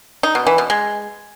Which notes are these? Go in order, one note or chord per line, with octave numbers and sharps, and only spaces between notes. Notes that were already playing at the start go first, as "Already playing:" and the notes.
D#4
B2
E3
B2
G#3